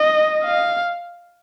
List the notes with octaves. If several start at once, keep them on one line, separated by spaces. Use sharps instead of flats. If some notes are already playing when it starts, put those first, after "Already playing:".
Already playing: D#5
F5